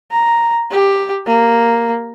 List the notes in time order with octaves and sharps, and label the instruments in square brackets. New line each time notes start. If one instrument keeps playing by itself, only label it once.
[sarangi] A#5
G4
A#3